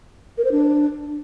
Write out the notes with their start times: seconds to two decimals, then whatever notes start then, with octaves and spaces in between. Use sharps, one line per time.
0.38 A#4
0.45 C5
0.51 D4